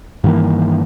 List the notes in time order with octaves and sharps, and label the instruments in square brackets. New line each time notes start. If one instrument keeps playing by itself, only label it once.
[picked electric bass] G2 D#3 E3 A#3